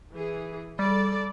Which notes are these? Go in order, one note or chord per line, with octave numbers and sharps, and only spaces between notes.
E3 G#4
G3 A4 D5